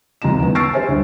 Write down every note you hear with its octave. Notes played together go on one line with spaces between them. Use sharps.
D#2 C3 F4 A#5 E7
D#2 B3 C#4
C#6 E6 F6 A6 C7 D7
G4 B4 C5 E5 G#5
D2 G2